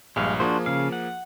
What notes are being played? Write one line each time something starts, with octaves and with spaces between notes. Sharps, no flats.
A#1 G2 G#3 F5
F3 A#3 D4 F#4 G#4 C5
C#3 F5
F#5